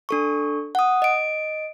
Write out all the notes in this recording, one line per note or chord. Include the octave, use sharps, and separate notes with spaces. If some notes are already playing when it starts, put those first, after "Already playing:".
D4 A4 C#6
F#5 D#6
D#5 D7